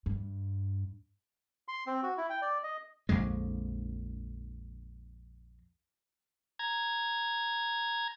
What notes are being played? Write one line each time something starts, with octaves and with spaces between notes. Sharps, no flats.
G2
C6
C4
F#4
E4
G5
D5
D#5
A#1 F2 D3 G#3
A#5 G#6